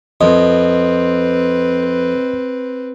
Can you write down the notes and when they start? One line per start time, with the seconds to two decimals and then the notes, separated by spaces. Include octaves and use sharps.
0.21 F2 C4 B4 D#5